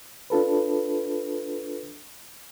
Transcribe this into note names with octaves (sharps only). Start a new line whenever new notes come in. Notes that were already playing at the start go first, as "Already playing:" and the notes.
D4 F4 A4 B4